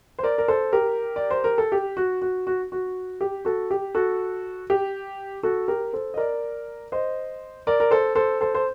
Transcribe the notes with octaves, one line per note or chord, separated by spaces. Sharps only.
C5
A#4 D5
A#4
A4 C5
G4 A#4
D5
C5
A#4
A4
G4
F#4
F#4
F#4
F#4
G4
F#4 A4
G4
F#4 A4
G4
F#4 A4
G4 A#4
A4 C5
D#5
A#4 D5
C5 D#5
A#4 D5
A#4
A4 C5
A4 C5
A4 C5
C5